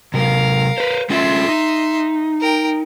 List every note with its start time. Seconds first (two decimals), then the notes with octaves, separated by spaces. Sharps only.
0.14 C3 F#3 A#4 F5
0.78 B4 C5
1.10 A3 C#4 F4 E5 C6
1.49 D#4
2.41 A#4 G5